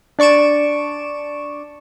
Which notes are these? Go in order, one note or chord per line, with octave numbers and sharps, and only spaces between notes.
D4 D5 C#6 D7 E7